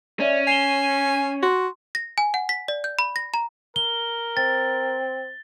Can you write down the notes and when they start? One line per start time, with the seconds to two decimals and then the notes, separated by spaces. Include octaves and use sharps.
0.20 C#4 D5 E5
0.47 G#5 C7 E7 G7
1.42 F#4 C6
1.95 A#6
2.18 G#5
2.34 F#5
2.49 B6
2.68 D5
2.84 G6
2.99 B5
3.16 A#6
3.34 A#5
3.76 A#4 G7
4.37 C4 A6